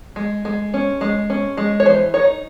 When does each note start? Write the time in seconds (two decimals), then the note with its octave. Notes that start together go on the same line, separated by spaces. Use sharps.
0.16 G#3
0.45 G#3
0.74 C#4
1.01 G#3
1.30 C#4
1.57 G#3
1.80 C#5
1.86 E3 C5
2.14 D#4 C#5